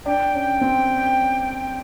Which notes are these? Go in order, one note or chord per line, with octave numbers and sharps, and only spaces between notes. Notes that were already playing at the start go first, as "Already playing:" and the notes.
D4 G5
C#4
C4